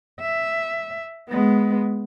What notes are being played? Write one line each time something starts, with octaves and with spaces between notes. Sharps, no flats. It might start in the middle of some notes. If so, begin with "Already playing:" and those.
E5
G#3 B3